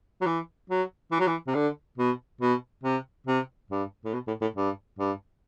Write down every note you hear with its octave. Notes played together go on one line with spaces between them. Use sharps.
F#3
E3
F#3
E3
F#3
E3
C3
D3
B2
B2
C3
C3
G2
A2
B2
A2
A2
G2
G2